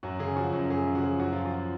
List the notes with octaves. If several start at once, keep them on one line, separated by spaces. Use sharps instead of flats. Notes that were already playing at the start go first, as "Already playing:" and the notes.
F#2 F#4
C#3 G#4
F3 F#4
F#2
F#2 G#4
C#3
F#4
F3 G#4
F#2 F#4
F3 F4
F#4
F3